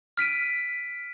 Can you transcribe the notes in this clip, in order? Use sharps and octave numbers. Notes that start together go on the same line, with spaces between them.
F6 B6 D7 D#7